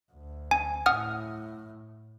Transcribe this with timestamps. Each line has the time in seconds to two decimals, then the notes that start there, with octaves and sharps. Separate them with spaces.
0.12 D2
0.51 G#5
0.86 A2 F#5 D#6 F6